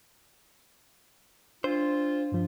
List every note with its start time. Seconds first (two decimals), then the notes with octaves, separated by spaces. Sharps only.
1.64 D4 F4 C5
2.32 G2 F3 D4